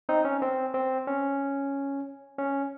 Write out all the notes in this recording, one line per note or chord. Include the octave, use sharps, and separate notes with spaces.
C4 D#4
C#4
C4
C4
C#4
C#4